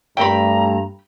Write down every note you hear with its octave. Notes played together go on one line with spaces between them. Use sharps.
G2 A3 C4 A#4 G5 A#5 B5